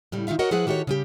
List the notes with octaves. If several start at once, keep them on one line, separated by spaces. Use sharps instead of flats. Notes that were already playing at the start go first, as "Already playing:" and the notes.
A2 C#3 G3
D#3 D#4 F4 E5 F5
F#4 A#4 C#5 D#5 F#5
F3 E4 G#4 B4 F#5
D#3 F#4 G4 A4 C#5
C#3 G3 G4